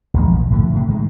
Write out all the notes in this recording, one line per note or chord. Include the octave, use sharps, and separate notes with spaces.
A1 D#2 F3 G#3
A#1
A2 D3 F3
D2 A2 C3
D#3 G#3